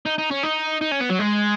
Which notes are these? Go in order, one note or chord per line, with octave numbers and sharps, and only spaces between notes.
D#4
D#4
C#4
D#4
D#4
C#4
B3
F#3
G#3